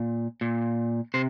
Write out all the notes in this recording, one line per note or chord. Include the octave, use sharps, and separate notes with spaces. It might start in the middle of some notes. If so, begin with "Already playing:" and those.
Already playing: A#2
A#2
C3 C5